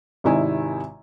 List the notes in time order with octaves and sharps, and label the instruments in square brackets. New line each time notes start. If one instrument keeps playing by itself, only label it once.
[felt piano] G#1 C3 D#3 E4 D#5 G#5